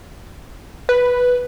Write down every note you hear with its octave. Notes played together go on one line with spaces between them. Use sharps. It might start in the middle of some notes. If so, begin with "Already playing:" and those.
B4